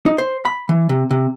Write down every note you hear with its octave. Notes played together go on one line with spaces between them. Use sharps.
D#4
C5
B5
E3
C3
C3